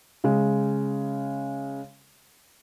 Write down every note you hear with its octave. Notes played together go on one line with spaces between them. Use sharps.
C#3 G#3